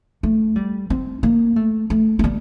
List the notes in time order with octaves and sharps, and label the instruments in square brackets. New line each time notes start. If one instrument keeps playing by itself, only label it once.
[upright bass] A3
G3
C4
A#3
A3
A3
A3
G3